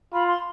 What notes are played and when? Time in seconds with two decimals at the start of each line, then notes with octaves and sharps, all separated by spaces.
0.13 F4 B5
0.28 C6